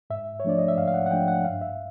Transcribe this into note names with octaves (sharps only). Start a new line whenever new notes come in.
G#2 E5
C#5
F3 A3 D4 D5
D#5
E5
G#2 F5
F5
F#5
F#5
F3 A3 D4 G5
F#5
G2 F5
E5